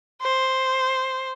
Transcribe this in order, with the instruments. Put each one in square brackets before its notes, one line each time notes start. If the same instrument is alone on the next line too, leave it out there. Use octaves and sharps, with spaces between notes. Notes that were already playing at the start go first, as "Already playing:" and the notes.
[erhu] C5